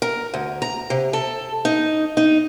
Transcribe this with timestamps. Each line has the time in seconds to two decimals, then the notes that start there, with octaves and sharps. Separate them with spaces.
0.02 A#4
0.34 D2
0.62 A#5
0.90 C3
1.13 A4
1.65 D#4
2.17 D#4